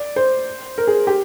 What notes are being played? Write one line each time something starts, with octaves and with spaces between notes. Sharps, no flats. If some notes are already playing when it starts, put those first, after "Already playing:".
Already playing: D5
C5
A#4
G#4
G4